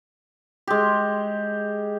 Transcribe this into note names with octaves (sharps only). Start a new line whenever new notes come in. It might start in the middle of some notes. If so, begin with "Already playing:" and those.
G#3 G4